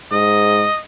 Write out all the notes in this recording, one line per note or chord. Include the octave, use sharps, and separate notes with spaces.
G#2 D#5